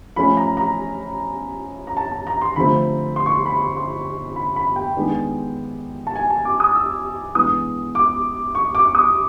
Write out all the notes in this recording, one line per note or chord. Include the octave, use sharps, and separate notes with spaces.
F3 A3 C#4 B5
A#5
A#5
A#5
A5
A5
A#5
C6
D3 F3 A3 C4 B5
C6
C#6
C6
B5
C6
C6
B5
B5
G5
D#3 G#3 B3 D4
A5
G#5
A5
D6
D#6
E6
E3 G#3 B3 D4 D#6
D6
C#6
D6
D#6